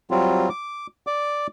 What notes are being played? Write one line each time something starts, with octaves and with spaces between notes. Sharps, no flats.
F#3 G3 C4 F4
D6
D5 D6